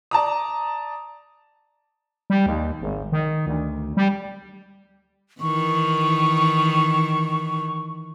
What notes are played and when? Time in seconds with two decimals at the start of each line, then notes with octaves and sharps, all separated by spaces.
0.11 D5 A5 A#5 D#6
2.30 G3
2.46 D#2
2.81 G#1
3.12 D#3
3.47 D2
3.97 G3
5.41 D#3 E3 C#6